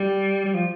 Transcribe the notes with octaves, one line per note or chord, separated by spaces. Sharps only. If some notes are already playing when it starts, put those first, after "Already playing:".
Already playing: G3
G3
F3